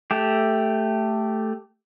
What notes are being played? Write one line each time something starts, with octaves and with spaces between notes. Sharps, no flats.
A3 G4